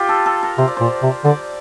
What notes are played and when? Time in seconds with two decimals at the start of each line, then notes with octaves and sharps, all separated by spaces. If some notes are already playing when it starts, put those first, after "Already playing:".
Already playing: F4 G4
0.09 A4
0.26 A4
0.43 A#4
0.58 C3 C5
0.68 D5
0.77 A#2 C5
1.03 C3
1.25 D3 D5